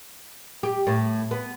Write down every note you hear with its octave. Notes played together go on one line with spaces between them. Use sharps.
G4
A2
B3